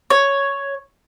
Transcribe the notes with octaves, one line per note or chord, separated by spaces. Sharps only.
C#5